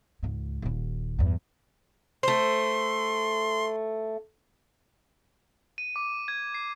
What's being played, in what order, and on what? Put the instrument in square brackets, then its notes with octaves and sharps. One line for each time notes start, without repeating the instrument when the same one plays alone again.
[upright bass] C#2 G#2
D#1 D#2
E2 G2
[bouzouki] A3 C5 [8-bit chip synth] C6
[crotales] D#7
D6
G#6
C7